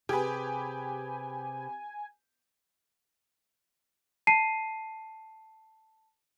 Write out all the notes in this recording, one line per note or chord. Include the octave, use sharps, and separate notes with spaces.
C3 G4 G#4 B4 G#5
A5 C7 D#7